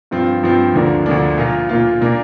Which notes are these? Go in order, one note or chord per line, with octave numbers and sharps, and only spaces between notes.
G2 F3 C4 F4
G2 F3 C4 F4
D2 D3 F3 A#3 D4
D2 D3 F3 A#3 D4
A#2 A#3 F4
A#2 A#3 F4
A#2 A#3 D4